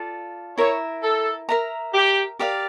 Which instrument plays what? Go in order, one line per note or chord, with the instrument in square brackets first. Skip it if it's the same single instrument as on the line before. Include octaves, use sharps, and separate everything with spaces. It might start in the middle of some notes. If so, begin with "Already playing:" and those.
Already playing: [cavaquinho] F4 A4 D5
[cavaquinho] E4 A#4 E5 [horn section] C#5
[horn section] A4
[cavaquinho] A#4 E5 A#5
[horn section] G4
[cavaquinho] G4 A#4 D5 F5